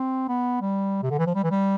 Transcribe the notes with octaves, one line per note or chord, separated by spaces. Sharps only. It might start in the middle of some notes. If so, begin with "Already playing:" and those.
Already playing: C4
B3
G3
C3
D3
E3
F3
G3
E3
G3